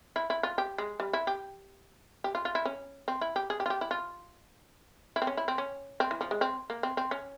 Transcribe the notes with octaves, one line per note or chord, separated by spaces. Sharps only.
E4
E4
F4
G4
G#3
G3
E4
G4
G4
F4
F4
E4
C#4
C4
E4
G4
G#4
G4
F4
G4
E4
F4
E4
C4
C#4
E4
C4
C#4
C4
E3
F3
G#3
C4
A#3
C4
C4
C#4